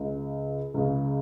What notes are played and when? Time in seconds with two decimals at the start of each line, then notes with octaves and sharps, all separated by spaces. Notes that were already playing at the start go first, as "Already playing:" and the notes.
Already playing: C#2 C#3
0.74 C#2 C#3